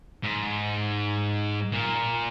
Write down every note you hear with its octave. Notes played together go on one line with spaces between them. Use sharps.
G#2
A#2